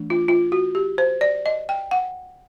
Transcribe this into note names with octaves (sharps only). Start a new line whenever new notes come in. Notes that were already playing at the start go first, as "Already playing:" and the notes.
Already playing: E3 A3 D4
F4
F4
F#4
G4
C5
D5
D#5
G5
F#5